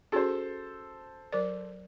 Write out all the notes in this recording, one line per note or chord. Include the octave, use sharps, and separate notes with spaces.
C#4 F#4 G#4 A4 C5
F#3 A#4 D5